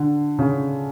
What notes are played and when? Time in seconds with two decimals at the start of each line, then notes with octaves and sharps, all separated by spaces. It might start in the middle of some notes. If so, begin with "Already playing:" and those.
Already playing: D3
0.39 C#3